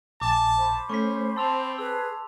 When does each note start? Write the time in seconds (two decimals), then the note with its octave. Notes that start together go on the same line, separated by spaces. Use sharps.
0.22 A#1 G#5 A5 D6
0.57 C5 B5
0.90 A3 C#4 C#6 B6
1.36 C4 A5 C6 E6 F7
1.78 G#4 B4 E6